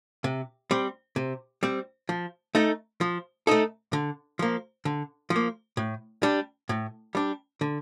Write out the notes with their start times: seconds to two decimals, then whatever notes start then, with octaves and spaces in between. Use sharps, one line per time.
0.24 C3
0.71 G3 C4
1.16 C3
1.63 G3 C4
2.09 F3
2.55 A3 D#4 A4
3.01 F3
3.47 A3 D#4 A4
3.93 D3
4.39 F3 A#3
4.85 D3
5.30 F3
5.36 A#3
5.77 A2
6.23 G3 D4
6.69 A2
7.15 G3 D4
7.61 D3